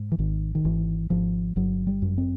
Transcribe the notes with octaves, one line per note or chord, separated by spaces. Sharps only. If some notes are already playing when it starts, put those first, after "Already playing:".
Already playing: G#2
E3
G#1 D#3
D#3
G#1 E3
G#1 F3
G1 F#3
G3
F#2
C4